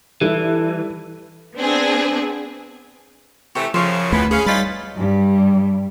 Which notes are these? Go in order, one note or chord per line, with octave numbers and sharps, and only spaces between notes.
E3 G3 E4 A4
B3 C4 D4 G#4
C3 E3 A3 G4 C#6
F#2 C#3 F3 C5 C#5
D2 C#3 E3 A3 B3 B4
C#4 G#4 B4 F5
G3 C#4 D#4 F4 B5 A6 B6
G2 G3